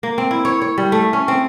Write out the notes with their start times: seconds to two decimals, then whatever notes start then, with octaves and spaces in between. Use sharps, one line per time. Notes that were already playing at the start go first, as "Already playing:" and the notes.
0.03 A#3
0.18 C4
0.31 E4
0.45 C#5
0.62 C#5
0.78 G3
0.92 A3
1.13 C#4
1.28 C4